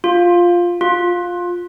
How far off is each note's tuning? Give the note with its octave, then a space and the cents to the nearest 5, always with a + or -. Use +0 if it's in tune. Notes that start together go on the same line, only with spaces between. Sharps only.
F4 +5
F4 +15